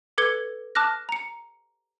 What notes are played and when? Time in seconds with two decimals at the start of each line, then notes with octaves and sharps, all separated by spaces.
0.18 A4 B4 D6 G#6 C#7 G7
0.75 A5 D6 F6 F#6 A#6
1.09 A#5 C#7